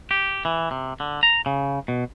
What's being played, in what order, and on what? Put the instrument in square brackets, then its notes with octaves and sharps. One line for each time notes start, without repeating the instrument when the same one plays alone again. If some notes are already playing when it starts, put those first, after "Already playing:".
[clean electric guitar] G4
E3
C3
D3
A#5
C#3
B2